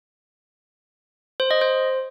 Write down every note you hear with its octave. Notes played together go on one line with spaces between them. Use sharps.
C5
D#5
C5